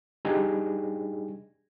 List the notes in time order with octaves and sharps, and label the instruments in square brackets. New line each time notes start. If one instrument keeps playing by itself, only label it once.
[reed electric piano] G3 D4 D#4 G4 G#4